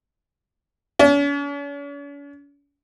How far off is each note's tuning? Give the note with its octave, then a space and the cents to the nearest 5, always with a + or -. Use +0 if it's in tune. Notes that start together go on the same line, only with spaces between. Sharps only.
C#4 +45